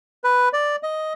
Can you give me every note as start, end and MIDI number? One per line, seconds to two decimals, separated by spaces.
0.24 0.49 71
0.53 0.76 74
0.83 1.13 75